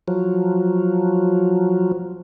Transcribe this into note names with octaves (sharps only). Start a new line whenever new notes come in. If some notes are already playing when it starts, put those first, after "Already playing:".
F3 F#3